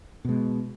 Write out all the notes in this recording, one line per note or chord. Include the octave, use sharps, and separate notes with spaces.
B2 G#3